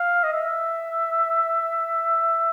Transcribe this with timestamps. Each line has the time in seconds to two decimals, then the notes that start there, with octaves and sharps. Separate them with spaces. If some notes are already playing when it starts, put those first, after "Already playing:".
Already playing: F5
0.23 D#5
0.33 E5